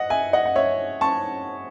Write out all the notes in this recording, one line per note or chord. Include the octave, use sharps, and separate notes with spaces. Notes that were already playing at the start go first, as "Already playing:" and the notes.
Already playing: D#5 F#5
E5 G#5
D#5 F#5
F#5
C#5 E5
A5 C#6